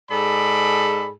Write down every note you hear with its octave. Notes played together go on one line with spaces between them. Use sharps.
G#2 G#4 A4 D5 B5